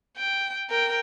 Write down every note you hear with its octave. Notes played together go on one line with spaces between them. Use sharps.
G5
A#4 G5